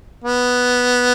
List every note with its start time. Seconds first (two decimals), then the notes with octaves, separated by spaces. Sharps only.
0.24 B3